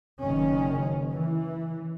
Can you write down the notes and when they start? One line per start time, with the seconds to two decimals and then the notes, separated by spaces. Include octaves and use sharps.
0.21 F#1 D#3 C#4
1.14 E3